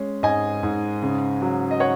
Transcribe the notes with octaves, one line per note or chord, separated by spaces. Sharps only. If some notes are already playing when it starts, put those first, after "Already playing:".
Already playing: G#3 C#4
G#2 D#5 G#5
G#2
C#3
F#3
D#5
C#5 F#5